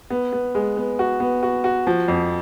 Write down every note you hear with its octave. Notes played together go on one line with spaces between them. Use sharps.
B3
B3
G#3
B3
F#4
B3
F#4
F#4
F3
F2